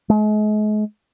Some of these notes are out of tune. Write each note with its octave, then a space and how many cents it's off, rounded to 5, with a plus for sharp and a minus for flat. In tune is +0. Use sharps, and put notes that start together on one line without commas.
G#3 +40